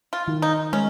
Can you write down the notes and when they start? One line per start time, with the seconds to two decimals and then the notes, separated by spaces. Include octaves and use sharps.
0.13 F4
0.27 D#3
0.42 D#4
0.73 G#3 C#4